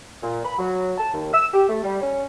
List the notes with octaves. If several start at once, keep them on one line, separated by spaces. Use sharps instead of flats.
A#2
B5
F#3
A5
D#2
E6
G4
A3
G3
C#4